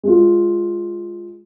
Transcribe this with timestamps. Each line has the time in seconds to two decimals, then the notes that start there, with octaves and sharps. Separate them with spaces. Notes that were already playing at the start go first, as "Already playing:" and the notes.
0.03 G#3 F4